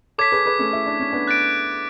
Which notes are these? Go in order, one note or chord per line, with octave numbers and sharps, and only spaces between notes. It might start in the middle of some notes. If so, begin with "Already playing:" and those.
A4 C#5 D6 G#6 B6
G#4 B4
G#4 B4
A3 C#4
E4
D4
C#4
B3 D4
F#6 A6 D7